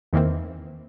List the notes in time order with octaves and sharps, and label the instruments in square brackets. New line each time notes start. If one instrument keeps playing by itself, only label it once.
[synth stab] E2 D#3 E3 A#3 C4